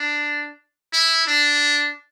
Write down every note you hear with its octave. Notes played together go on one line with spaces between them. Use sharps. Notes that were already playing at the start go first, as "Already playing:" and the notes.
Already playing: D4
E4
D4